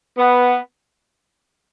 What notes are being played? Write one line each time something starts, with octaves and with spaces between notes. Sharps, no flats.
B3